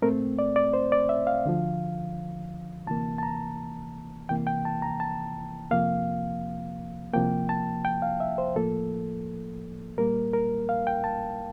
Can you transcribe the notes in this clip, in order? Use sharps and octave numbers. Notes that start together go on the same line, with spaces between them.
A#2 A3 C4 A#4
D5
D5
C5
D5
E5
F5
D2 D3 F3
D2 C3 E3 A#3 A5
A5
A#5
C2 C3 E3 A#3 G5
G5
A5
A#5
A5
F2 C3 F3 A#3 F5
C2 C3 F3 A#3 G5
A5
G5
F5
E5
C5
A2 F3 A#3 A4
A#2 G3 A#3 A#4
A#4
F5
G5
A5